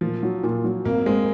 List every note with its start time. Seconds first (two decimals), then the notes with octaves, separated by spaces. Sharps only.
0.01 A#2 F3
0.23 F#3
0.43 A#2
0.64 F#3
0.85 G#1 A#3
1.06 G#3 C4